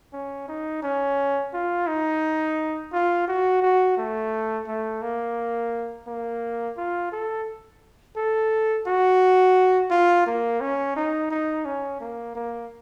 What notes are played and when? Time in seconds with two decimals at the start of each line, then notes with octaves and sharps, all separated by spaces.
0.13 C#4
0.48 D#4
0.83 C#4
1.53 F4
1.87 D#4
2.93 F4
3.28 F#4
3.62 F#4
3.98 A3
4.67 A3
5.02 A#3
6.07 A#3
6.77 F4
7.12 A4
8.17 A4
8.86 F#4
9.91 F4
10.26 A#3
10.61 C#4
10.96 D#4
11.31 D#4
11.65 C#4
12.01 A#3
12.35 A#3